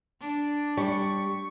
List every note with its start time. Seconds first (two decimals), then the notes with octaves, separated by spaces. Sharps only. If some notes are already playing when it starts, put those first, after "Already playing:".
0.21 D4
0.77 G3 C#6